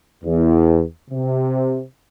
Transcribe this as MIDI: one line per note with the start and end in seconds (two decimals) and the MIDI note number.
0.24 0.82 40
1.11 1.82 48